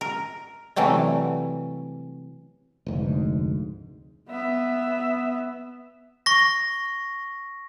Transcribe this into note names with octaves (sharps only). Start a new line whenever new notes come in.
A#4
C3 E3 F#3 G3 A3
F1 D2 G#2
B3 E5
C#6 A#6